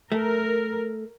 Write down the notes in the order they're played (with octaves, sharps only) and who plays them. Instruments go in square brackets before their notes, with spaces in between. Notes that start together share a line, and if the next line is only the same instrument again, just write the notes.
[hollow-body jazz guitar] A3 [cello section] A#4